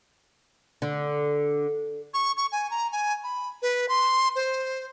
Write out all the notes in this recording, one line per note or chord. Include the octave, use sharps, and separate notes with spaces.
D3
C#6
C#6
G#5
A#5
G#5
B5
B4
C6
C5